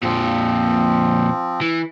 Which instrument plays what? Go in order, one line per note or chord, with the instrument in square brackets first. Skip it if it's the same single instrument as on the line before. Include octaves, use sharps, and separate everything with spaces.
[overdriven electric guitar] F2 A#2 [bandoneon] F3 C4
[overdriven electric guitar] E3